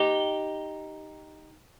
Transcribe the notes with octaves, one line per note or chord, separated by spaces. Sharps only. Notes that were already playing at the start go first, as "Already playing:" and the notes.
Already playing: D#4 G4